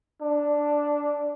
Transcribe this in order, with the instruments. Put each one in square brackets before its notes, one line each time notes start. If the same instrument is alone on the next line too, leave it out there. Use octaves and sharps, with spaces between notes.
[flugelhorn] D4